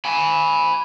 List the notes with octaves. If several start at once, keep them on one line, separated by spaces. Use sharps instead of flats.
G#5 B5